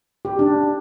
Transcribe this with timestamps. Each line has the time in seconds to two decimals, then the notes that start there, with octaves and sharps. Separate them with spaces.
0.25 G4
0.39 D4